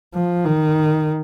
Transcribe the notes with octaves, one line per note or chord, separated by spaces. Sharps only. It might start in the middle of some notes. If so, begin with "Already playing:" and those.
F3
D#3